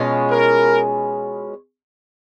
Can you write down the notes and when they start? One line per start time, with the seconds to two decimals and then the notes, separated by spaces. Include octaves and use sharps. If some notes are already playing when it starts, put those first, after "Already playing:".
Already playing: B2 G#3 C#4 F4
0.31 A#4